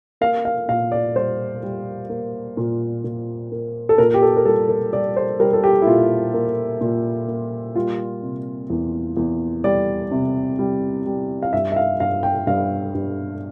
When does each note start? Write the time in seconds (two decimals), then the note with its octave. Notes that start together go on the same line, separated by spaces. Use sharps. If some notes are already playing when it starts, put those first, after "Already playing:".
0.21 A#3 F5
0.45 F5
0.68 A#2 F5
0.92 D5
1.16 G3 C5
1.63 G3
2.09 A#3
2.57 A#2
3.04 A#2
3.52 A#3
3.89 A4
3.98 A#2 A#4
4.14 G4
4.22 A4
4.37 A#4
4.45 G3 A4
4.69 A#4
4.92 G3 D5
5.17 C5
5.40 G3 A#4
5.53 A4
5.64 G4
5.82 E4
5.87 A#2 F4
6.34 A#3
6.81 A#2
7.28 A#3
7.76 G3 F4
8.23 C3
8.70 E2
9.17 E2
9.64 G3 D5
10.11 C3
10.59 G3
11.06 G3
11.42 F5
11.53 G2 E5
11.72 E5
11.76 F5
12.00 G2 F5
12.23 G5
12.47 G2 F5
12.94 G2